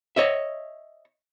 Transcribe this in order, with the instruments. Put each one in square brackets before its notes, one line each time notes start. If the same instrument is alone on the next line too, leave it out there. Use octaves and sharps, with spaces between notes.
[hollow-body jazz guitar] C#5 D#5 E5